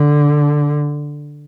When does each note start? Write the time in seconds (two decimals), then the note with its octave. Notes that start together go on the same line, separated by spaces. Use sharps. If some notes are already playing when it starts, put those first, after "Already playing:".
Already playing: D3